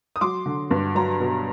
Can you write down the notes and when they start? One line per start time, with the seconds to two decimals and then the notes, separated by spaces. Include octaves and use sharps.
0.16 D#6
0.21 F#3 C6 D6
0.46 D3
0.71 G2
0.95 F#3 A#5 C6
1.20 B2